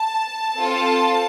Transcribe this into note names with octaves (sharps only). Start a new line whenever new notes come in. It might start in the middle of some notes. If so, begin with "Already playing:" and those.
Already playing: A5
C4 F4 A4